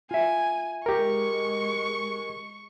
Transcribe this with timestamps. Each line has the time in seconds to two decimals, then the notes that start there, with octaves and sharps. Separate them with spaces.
0.11 F4 E5 G#5
0.86 G#3 G4 A#4 C#6